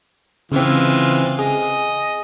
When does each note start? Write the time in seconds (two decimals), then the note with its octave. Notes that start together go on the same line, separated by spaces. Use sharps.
0.52 C#3 E3 G#3 C4 F4
1.39 G#4 D#5